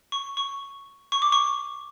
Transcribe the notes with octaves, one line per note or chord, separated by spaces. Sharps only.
C#6
C#6
C#6
D6
C#6